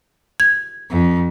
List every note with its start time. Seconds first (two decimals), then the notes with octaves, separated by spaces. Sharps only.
0.40 G#6
0.90 F2